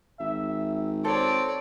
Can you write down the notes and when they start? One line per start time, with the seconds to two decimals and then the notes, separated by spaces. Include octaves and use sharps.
0.20 G#1 E5
1.05 C4 A4 C#5 D5